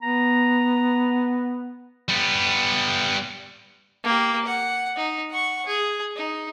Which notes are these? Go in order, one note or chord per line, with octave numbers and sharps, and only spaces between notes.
B3 A#5
G3 B3
A#3 G4
F#5
D#4
F#5 C#6
G#4
D#4